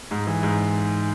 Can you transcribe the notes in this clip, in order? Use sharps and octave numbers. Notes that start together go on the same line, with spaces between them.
G#2
E3
G#2